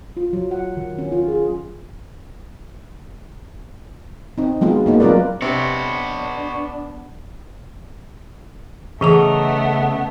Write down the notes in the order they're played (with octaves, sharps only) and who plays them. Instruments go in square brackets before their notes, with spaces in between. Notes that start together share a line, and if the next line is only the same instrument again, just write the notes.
[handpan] F4
F#3
F#5
D#3
C#4
F4
G#4
C4 D#4
F#3 G#3 B3 F4
G#3 A#3 D#4
F#3 C4 F4 A#4 B4 D5
[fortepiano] C3 [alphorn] B3 [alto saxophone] D4 [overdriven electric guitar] B4 C#5
[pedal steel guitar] C#3 D#5 A#5 [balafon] E3 G#4 D6 [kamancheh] A3 B3